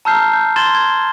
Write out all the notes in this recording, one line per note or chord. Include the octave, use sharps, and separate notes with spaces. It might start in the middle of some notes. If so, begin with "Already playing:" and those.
A5 A#5 E6 F6 G6 C7
G6
C6 G#6 A6 E7 G7
G#6